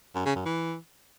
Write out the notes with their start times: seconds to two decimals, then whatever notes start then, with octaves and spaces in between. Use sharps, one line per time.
0.15 F#2
0.25 C#3
0.36 F#2
0.46 E3